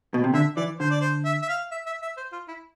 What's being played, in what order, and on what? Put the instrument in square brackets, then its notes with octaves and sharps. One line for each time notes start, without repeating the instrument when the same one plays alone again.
[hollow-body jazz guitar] B2
C3
[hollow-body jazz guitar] D3 [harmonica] E5
[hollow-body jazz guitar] E3 [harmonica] D5
[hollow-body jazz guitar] D3 [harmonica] C5
[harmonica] D5
C5
E5
E5
F5
E5
E5
E5
C5
F4
E4